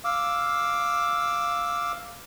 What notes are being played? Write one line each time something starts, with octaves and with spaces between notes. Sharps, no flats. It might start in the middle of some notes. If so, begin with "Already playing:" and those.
F5 D6 E6